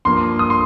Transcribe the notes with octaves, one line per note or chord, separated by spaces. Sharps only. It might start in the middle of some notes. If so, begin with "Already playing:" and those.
G2 F3 A#3 C6
D#6
C6